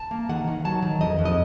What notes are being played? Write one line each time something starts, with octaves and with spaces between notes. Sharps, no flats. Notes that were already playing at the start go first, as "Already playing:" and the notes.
Already playing: A5
A#3
D#3 F#5
D#3
F#3 A5
D#3
F2 D#5
F2
D#5